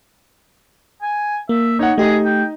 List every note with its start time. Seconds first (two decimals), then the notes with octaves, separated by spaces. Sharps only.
1.02 G#5
1.49 A#3 E5
1.79 D#4 C#5 F#5
1.98 A3 D#4 G4 G#4 D#5
2.25 G5